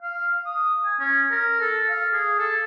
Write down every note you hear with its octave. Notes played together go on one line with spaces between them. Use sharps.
F5
D#6
G#5
C#4
A#4
A4
F5
G#4
A4